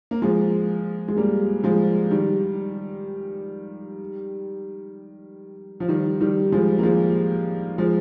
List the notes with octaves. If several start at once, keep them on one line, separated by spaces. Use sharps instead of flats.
A#3
F3 G#3
G#3
G3 A#3
F3 G#3
D#3 G3
F3
D#3 G3
D#3 G3
F3 G#3
A#3
F3 G#3
F3 G#3